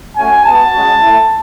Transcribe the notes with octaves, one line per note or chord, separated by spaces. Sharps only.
A3 C#4 F#4 G#5
G#3 B3 F#4 A5
G#3 C#4 F#4
A3 E4